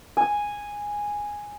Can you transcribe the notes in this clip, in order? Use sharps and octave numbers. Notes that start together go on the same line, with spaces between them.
G#5